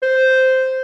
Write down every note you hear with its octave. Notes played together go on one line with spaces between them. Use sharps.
C5